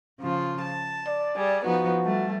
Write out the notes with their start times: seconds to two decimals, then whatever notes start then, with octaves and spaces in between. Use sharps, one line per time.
0.20 C#3 F3 F4
0.61 A5
1.07 D5
1.35 G3 G#4
1.64 F3 B3 D#4 F#4
2.04 G3 A3